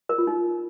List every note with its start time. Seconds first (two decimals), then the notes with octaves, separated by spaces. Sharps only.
0.09 A#4
0.18 F4
0.27 D#4